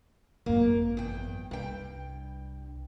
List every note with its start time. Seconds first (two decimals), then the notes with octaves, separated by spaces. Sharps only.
0.46 G#1 F#2 A#3
0.97 E2 G5
1.51 C2 G2 G5